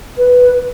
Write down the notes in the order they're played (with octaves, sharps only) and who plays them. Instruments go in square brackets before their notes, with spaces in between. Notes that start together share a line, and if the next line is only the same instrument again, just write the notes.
[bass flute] B4